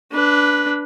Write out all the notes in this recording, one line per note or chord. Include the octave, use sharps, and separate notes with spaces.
D4 B4